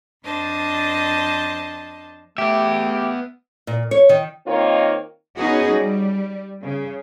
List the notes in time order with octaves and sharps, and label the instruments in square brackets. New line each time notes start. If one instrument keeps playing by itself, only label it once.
[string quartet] F2 D4 C5 D#5 A5
[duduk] A3 [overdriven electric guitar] B3 E5 [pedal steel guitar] G4
[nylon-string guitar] A#2
C#5
D#3
[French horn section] D#3 A#3 C4 D#4 F4 C#5
[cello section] B3 C#4 D#4 F#4 G#4
G3
C#3